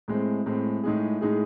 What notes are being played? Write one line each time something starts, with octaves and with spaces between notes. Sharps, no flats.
A2 G#3 C4
A2 G#3 C4
A2 G#3 D#4 G#4
A2 G#3 D#4 G#4